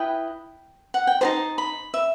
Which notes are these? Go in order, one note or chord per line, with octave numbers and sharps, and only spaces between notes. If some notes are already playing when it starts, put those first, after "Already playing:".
Already playing: E4 B4 D#5 G5
F#5
G5
D#4 G4 C5 A5
B5
E5